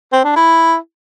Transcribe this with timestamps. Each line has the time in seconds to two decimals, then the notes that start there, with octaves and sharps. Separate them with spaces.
0.13 C4
0.25 D4
0.36 E4